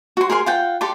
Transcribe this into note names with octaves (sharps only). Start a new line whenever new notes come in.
F#4 C6
G#4 A#4 G#5 C6
F4 F#5 G5
G4 A4 D5 C6